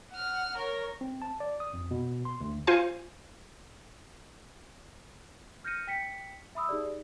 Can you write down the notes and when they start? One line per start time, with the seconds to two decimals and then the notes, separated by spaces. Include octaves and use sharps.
0.12 F#5 F6
0.57 A#4 C#5
1.01 C4
1.22 A5
1.40 D5
1.60 D#6
1.73 F2
1.91 B2
2.25 C6
2.41 D2
2.67 F4 C5 G#5
5.64 F6 G6 A#6 C#7 D#7
5.87 G5 B6 C#7
6.55 E5 B5 D#6 E6
6.69 D#4 G4 G#4 D5